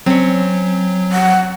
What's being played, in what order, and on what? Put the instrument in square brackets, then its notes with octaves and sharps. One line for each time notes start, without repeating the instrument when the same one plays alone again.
[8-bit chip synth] F#3 [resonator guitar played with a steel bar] C4 C#4
[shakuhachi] F#5